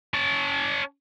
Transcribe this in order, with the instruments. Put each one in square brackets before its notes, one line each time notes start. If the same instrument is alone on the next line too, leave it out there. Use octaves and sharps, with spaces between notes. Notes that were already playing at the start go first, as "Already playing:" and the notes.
[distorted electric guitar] C#4 A5